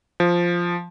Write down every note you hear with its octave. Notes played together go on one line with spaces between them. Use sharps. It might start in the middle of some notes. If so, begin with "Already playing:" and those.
F3